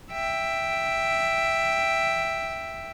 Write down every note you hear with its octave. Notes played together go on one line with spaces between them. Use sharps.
E5 G5